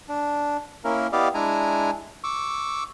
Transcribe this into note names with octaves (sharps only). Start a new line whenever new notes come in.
D4
A#3 C#4 E4 A#4
B3 E4 G4 D5 D#5 F5
G#3 D4 E4 G#5 A#5
C#6 D6 E6